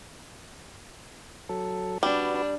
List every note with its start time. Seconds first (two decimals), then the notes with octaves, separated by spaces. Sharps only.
1.49 F#3 A4
2.03 G3 D4 F#4 B4